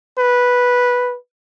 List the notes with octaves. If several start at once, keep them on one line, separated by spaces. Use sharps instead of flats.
B4